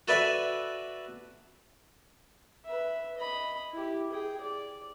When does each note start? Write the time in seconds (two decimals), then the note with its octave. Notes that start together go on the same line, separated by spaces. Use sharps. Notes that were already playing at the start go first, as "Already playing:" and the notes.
0.08 F#4 A4 B4 D5 E5 G#5
2.65 B4 E5
3.18 D#5 B5
3.72 E4 G4
4.11 G#4 G5
4.41 D5